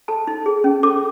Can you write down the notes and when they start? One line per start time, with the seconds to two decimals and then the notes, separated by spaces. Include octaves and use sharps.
0.08 A4 A5
0.27 D#4
0.46 G#4
0.64 C#4
0.83 A4 D6